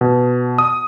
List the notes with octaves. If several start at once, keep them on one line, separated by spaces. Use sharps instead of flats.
B2
D#6